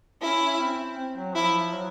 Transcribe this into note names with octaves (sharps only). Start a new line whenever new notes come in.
C#4 E4
C4
C4
F#3
F3 E4
F#3